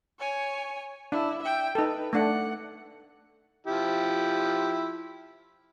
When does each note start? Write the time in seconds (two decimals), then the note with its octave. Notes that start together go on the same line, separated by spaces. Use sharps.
0.19 C#5 G#5
1.12 D4 E4
1.42 E5 G5
1.75 D#4 A4 B4
2.13 A3 D4 F#5
3.67 F3 E4 G4